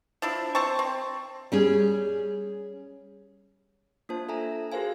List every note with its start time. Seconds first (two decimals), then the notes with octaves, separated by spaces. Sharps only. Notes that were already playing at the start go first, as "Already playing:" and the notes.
0.22 F3 D4 E4
0.55 C4 C5 A5 C#6
0.79 C4
1.52 G3 C#4 G#4
4.09 A#3 D4 F4 C5 A5
4.29 A4 E5 G#5 A#5
4.72 F#4 G#4 A#4 C5 F5 G#5